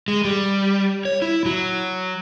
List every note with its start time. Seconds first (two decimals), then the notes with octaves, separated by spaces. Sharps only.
0.08 G#3
0.25 G3
1.05 C#5
1.22 E4
1.46 F#3